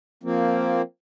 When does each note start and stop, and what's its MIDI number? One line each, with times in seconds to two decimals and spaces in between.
0.23 0.82 53
0.23 0.82 58
0.23 0.82 60